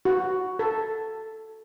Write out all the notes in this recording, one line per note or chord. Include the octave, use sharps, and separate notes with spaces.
F#4
A4